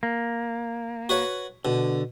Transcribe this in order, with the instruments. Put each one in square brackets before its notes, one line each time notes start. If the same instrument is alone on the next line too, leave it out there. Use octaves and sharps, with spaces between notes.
[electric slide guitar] A#3
[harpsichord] F#4 B4 C#5
[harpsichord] B2 [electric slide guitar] D3